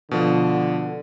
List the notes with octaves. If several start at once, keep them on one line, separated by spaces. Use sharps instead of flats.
B2 D3 F3